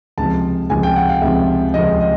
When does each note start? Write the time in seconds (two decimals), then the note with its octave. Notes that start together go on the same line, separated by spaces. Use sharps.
0.18 C#2 C3 F3 A5
0.70 C#2 C3 F3 G#5
0.83 G5
0.96 F#5
1.09 F5
1.22 C#2 C3 F3 E5
1.74 C#2 C3 F3 D#5
2.00 D#5